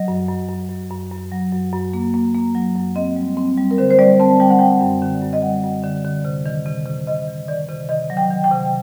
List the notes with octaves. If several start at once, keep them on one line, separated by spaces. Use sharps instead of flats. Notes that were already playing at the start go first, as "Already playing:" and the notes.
Already playing: F#3 D#5
F#2
F#2
F#2
F#2
F#2
F#2
F#3
F#2
F#2
A#3
A#3
A#3
F#3
F#2
C4 D#5
G3
C4
G3
A#4
D3 C5
C5
G3 D5
C4 A5
G3 G5
F#5
G3 G5
F#2
D3
F#2
D#5
G3 F#5
F#2
D3
D3
C3
D#3
C3
C3
C3 D#5
D#3
D#3 D5
C3
D#3 D#5
F#3
G5
D#3
G5
C3